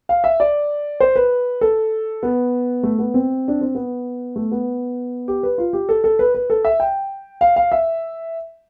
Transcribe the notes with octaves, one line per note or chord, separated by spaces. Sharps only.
F5
E5
D5
C5
B4
A4
B3
A3
B3
C4
D4
C4
B3
A3
B3
G4
B4
F4
G4
A4
A4
B4
B4
A4
E5
G5
F5
F5
E5